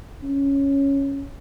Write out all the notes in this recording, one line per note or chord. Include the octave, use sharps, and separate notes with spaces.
C#4